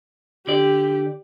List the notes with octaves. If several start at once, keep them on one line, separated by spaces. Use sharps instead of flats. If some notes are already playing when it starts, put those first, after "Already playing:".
D3 G4 D5